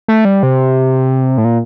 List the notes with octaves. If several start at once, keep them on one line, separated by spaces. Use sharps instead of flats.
A3
G3
C3
A2
A#2